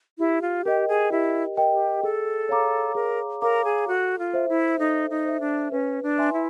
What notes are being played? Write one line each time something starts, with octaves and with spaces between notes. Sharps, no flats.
E4 G4
F4
G4 A#4 D#5 G5
G#4
E4 G4
A#4 D#5 G5
G4
G#4 A4
C#5 F5 A#5 D6
G#4 A#4
A#4 C#5 F5 A#5 D6
G#4
F#4 A4
F4
C5 E5
E4
D#4 A4
D#4
C5 E5
D4
C#4 B4
D4
E5 G#5 C6
E4